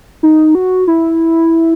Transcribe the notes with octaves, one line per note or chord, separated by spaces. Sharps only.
D#4
F#4
E4